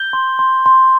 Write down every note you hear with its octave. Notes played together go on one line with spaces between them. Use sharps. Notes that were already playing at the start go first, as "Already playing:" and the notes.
Already playing: G6 G7
C6
C6
C6